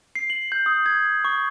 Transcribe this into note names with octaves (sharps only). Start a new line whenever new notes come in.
C7
F#7
G6
D#6
G#6
C#6